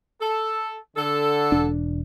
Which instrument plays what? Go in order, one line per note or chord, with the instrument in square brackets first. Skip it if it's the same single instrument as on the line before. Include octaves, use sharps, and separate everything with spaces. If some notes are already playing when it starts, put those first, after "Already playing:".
[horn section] A4
D3 A4
[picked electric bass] E1 D4